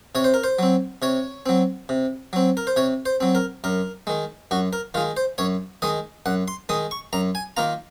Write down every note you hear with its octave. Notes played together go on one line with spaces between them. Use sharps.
C3 C#5
C5
A#4
C5
F#3 C4
C3 C#5
F#3 C4
C3
F#3 C4
A#4
C5
C3 C#5
C5
F#3 C4
A#4
F#2 A#4
D#3 G#3
F#2 F#4
A#4
D#3 G#3 F4
C5
F#2 C#5
D#3 G#3 D#5
F#2 F#5
C6
D#3 G#3 D#6
C#6
F#2 A#5
G#5
D#3 A#3 F4 A#5